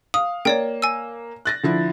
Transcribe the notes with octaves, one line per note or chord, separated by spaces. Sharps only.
F5 D#6
A#3 C#5 D5 G5
G#5 E6
F#6 A6 A#6
D3 F3 E4